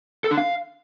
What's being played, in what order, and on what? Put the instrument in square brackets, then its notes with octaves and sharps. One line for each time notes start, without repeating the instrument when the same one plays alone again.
[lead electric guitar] A4
D4
F5